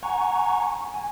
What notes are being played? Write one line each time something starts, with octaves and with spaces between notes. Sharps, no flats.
F#5 G#5 A#5 C#6
G#5